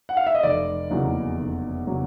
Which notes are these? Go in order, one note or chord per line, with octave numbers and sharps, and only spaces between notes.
F#5
F5
E5
D#5
F1 D5
E2 C#3 F#3 A#3
F1
C#3 F#3 A#3